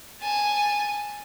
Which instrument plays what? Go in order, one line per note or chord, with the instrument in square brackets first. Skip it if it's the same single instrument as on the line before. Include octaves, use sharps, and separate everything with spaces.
[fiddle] G#5 A5